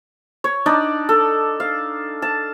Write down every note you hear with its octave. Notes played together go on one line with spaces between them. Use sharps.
C#5
D4 D#4 D5
A4
F5
A5